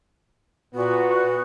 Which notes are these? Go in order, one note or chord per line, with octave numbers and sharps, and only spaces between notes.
A#2 B3 F#4